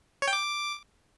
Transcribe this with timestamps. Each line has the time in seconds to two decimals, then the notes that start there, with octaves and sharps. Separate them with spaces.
0.22 C#5
0.28 G5
0.33 D6